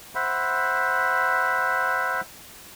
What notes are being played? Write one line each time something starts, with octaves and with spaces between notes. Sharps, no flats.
C5 E5 F#5 B5